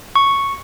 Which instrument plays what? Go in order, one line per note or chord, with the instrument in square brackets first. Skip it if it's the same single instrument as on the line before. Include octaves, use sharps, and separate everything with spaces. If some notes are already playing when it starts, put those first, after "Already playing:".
[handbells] C#6